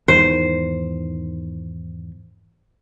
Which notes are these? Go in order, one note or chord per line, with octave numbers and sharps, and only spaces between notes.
E2 G#2 D#3 C5